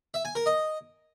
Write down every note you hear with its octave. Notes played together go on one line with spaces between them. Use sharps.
E5
G#5
A#4
D#5